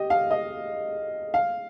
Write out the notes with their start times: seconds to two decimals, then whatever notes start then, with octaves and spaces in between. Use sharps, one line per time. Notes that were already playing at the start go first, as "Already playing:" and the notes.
Already playing: G4 D#5
0.10 F5
0.31 D#5
1.34 F5